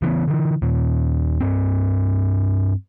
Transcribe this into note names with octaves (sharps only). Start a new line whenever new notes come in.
C#3 E3 A3 B3
D3 E3
D#2 A#2
G2 C4